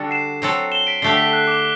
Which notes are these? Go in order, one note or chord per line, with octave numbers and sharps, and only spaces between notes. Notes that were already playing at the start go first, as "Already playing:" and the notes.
Already playing: D3 G3 D4 F#4 A4
C7 E7
F#3 C4 F#4 A4
E7 G7
B6 D7
D3 A3 D4 G4 C7
B6
F#6
D6